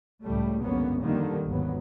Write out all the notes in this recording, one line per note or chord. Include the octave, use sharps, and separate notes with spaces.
C#2 A2 G3 A3
G1 C#2 F#2 A#3 B3 C#4
F2 D3 D#3 G3 A#3
G#1 D#2 F#3 B3